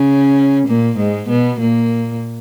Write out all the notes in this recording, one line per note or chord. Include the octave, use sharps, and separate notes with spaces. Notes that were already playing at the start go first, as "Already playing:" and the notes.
Already playing: C#3 C#4
A#2 A#3
G#2 G#3
B2 B3
A#2 A#3